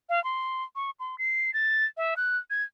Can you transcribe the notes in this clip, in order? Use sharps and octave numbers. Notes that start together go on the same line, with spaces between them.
F5
C6
C#6
C6
C7
A6
E5
F#6
G#6